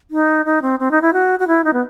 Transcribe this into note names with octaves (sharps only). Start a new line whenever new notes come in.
D#4
D#4
C4
C4
D#4
E4
F#4
F#4
E4
D#4
B3